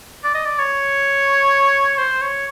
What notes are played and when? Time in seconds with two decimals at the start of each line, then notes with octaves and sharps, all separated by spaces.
0.24 D5
0.35 D#5
0.45 D5
0.59 C#5
1.98 C5
2.22 C#5